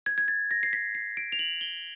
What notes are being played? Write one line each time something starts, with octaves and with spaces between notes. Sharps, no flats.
G#6
G#6
A6
A#6
C7
B6
C7
D7
F7
F#7
G7